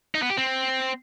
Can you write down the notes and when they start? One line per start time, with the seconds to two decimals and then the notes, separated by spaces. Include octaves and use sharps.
0.15 D#4
0.22 B3
0.30 G4
0.38 C4